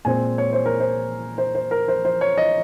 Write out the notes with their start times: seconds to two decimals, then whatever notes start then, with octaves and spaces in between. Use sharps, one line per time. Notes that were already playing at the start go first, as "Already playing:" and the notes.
0.05 A#2 G#3 C4 G#5
0.38 C#5
0.53 C5
0.66 A#4
0.80 C5
1.38 C5
1.55 C5
1.71 A#4
1.88 C5
2.05 C5
2.21 C#5
2.38 D#5